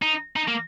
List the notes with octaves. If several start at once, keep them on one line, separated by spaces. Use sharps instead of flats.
D#4
D#4
A#3